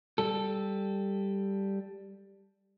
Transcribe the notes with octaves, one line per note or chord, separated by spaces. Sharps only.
G3 A4